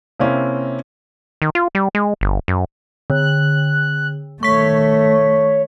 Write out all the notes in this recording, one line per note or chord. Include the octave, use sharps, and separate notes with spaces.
C3 A#3 C4 C#4 E4
D#3
F4
G3
G#3
G1
F#2
D3 F#6
D#3 A3 C#5 C#6 B6